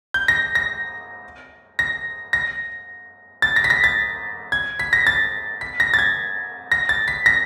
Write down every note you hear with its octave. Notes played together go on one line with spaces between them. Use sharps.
G6
A#6
A#6
A#6
A#6
A6
A#6
B6
A#6
A6
G#6
B6
A#6
A6
B6
A#6
A6
G#6
A#6
A6
B6
A#6